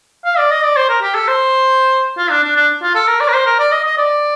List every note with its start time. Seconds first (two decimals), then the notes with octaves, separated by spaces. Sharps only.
0.25 F5
0.38 D5
0.51 D#5
0.64 D5
0.76 C5
0.89 A#4
1.02 G4
1.15 A4
1.28 C5
2.18 F4
2.31 D4
2.44 D4
2.56 D4
2.82 F4
2.95 A4
3.07 A#4
3.20 D5
3.29 A#4
3.33 C5
3.46 A#4
3.59 D5
3.72 D#5
3.85 D#5
3.98 D5